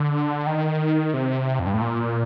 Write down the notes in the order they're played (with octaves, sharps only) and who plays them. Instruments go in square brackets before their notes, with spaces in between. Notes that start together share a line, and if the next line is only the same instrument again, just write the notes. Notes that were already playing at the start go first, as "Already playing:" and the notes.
Already playing: [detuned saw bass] D3
D#3
C3
F2
G2
A2
A#2